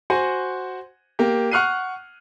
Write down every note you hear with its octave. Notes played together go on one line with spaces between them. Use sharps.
F#4 C5 F#5 G#5
A#3 G4
F#5 C#6 F6 F#6 C7 D#7